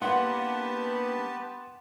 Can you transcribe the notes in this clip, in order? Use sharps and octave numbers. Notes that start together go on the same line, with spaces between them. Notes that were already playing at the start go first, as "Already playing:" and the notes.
G2 A#3 B3 G4 B4 F#5 A5 C6